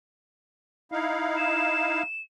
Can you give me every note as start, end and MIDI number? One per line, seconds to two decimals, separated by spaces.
0.92 2.03 63
0.92 2.03 64
0.92 2.03 77
1.37 2.22 100